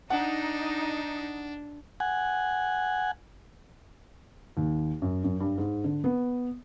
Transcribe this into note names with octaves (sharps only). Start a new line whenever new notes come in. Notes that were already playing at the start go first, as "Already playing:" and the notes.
D4 D#4 F#5
F#5 G#5
D#2
F#2
F#2
G2
G#2
D3
B3